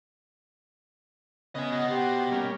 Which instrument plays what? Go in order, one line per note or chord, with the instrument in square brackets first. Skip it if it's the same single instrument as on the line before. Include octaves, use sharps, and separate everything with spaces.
[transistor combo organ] C#3 B3 [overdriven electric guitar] D#5 G#5
[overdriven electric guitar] B2 F#4 [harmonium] D#5
[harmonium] G4 [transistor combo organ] C5 F#5
[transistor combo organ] G3 A#3 C#4